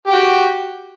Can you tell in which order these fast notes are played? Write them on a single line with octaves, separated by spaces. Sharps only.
G4 G5 F#4